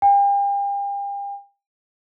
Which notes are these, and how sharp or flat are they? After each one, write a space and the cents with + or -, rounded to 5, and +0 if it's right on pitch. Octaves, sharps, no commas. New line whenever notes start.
G5 +40